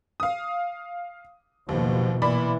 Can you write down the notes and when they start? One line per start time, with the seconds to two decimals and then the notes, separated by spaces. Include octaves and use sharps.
0.20 F5 D#6
1.69 F#1 D#2 B2 F3
2.22 A#2 E3 D5 B5